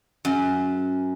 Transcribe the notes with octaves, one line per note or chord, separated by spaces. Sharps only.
F#2